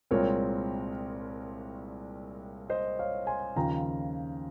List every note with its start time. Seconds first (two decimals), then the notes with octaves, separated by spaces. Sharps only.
0.11 C2 A#2 G#3 C4 A#4 C#5
2.70 C5 D#5
2.99 C#5 F5
3.27 G#5 C6
3.56 D#2 C#3 F3 G5 A#5